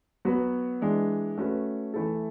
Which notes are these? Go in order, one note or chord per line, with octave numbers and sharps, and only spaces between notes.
F#3 B3 F#4 B4
E3 G#3 D4
A3 C#4 F#4 B4
E3 A3 E4 A4